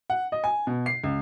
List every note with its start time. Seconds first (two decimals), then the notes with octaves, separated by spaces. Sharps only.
0.10 F#5
0.32 D#5
0.44 G#5
0.67 B2
0.86 C7
1.04 C#2